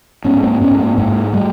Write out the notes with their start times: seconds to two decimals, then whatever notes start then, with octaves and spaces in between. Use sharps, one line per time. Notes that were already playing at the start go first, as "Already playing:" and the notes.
0.25 G#2 B3 C#4
0.43 A#3 C4
0.61 G#2 B3 C#4
0.79 A#3 C4
0.97 G#2 G#3 A#3
1.33 G3 A3